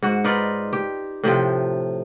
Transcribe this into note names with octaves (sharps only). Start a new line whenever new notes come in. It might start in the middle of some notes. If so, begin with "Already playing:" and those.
G#2 F#4
D#4 F4 B4 D5
G4
A2 C3 F3 G5